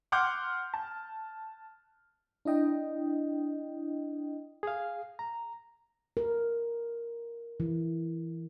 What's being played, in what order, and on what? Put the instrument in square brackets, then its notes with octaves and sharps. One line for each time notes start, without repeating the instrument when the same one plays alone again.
[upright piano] F#5 C6 D6 F6 G6
A5
[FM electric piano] D4 E4 D#5 G5
[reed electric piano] G#4 F5
A#5
[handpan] A#4
E3